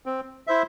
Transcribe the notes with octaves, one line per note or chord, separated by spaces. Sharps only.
C4
E4 C5 E5